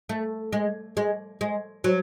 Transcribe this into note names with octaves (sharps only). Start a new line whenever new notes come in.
A3
G#3
G#3
G#3
F#3